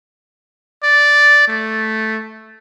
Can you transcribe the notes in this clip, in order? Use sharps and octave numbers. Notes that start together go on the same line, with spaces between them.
D5
A3